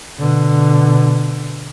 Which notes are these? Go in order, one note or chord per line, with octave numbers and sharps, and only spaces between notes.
B2 D3